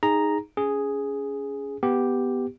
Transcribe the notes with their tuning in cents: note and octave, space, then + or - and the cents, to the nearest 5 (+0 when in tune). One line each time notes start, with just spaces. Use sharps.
D#4 +0 G#4 -10 A#5 +0
C#4 +25 G#4 +0
B3 +0 G4 +0